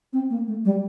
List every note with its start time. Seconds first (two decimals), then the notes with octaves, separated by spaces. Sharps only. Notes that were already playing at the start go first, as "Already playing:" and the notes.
0.13 C4
0.30 A#3
0.48 A3
0.65 G3